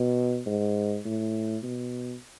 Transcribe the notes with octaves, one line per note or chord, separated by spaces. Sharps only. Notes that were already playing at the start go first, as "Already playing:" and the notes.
Already playing: B2
G#2
A2
B2